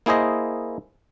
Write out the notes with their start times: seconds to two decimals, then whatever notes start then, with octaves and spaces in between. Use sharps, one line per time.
0.06 A#3 E4 G#4 C5 D#5